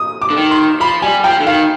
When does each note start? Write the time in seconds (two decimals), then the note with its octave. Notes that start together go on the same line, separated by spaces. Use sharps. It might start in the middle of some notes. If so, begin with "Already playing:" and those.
Already playing: D#6
0.22 D6
0.30 D3
0.36 D#3
0.51 C6
0.80 F3 B5
1.02 G3 G#5
1.24 F3 G5
1.40 D3
1.46 D#3 F5